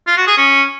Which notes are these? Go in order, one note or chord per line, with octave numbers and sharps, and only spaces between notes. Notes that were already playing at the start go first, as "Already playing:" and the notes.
F4
F#4
G#4
C#4